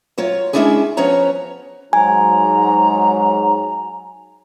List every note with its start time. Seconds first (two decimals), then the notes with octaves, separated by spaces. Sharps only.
0.18 F#3 F4 C#5
0.53 G#3 A#3 C#4 D4 E4 G#4
0.97 F3 B3 C#4 C#5 A#5
1.93 G#2 F#3 G#5 A#5